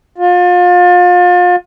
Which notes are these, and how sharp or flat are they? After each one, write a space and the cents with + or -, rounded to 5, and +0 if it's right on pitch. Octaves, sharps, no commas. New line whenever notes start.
F4 +35